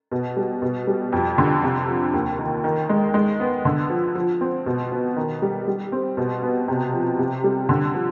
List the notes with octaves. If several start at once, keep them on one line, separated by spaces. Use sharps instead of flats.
B2
G3
B2
G3
F2
D3
C3
F3
D#2
D#3
D#3
G#3
G#3
B3
D3
F3
F3
C4
B2
B3
D#3
G3
G3
C4
B2
B3
C3
F3
C3
G3
D3
F3